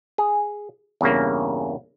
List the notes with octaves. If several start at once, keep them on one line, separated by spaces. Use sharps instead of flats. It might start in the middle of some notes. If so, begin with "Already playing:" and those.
G#4
E2 G2 C#3 A#3